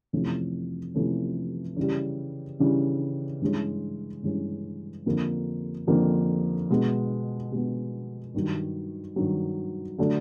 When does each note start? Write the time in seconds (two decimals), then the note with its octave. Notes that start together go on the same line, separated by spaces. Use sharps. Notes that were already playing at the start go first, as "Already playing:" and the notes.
0.13 F2 C3 E3 A3 C#4
0.95 F2 C3 E3 A3 C#4
1.76 C#3 E3 G3
2.60 C#3 E3 G3
3.41 G2 E3 G#3 C#4
4.23 G2 E3 G#3 C#4
5.06 F2 D3 F3 A#3
5.87 F2 D3 F3 A#3
6.70 B2 G#3 B3
7.52 B2 G#3 B3
8.34 G2 D#3 F#3
9.16 G2 D#3 F#3
9.98 D3 F#3 A3 D4